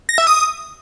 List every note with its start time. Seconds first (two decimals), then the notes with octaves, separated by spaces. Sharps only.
0.09 A#6
0.18 E5
0.27 D#6